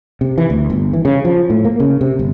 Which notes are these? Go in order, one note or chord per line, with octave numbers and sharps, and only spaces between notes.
C3
E3
D2
G1
E3
C#3
F3
A2
A#3
C#3
C3
G1